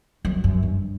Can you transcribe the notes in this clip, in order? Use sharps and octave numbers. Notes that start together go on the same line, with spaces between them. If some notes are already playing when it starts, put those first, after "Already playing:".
F#2
F#2
G2